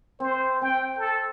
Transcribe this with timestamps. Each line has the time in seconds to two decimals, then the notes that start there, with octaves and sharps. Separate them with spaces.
0.20 C4 C5
0.62 C4 G5
0.98 A4